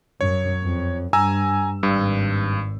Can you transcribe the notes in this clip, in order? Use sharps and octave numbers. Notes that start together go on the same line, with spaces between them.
F#2 C#5
F2
G2 G#5 A#5 E6
G#1 G2